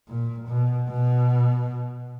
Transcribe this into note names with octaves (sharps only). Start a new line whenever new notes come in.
A#2
B2
B2